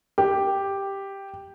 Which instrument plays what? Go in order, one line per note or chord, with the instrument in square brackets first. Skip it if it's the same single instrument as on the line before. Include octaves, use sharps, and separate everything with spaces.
[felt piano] G4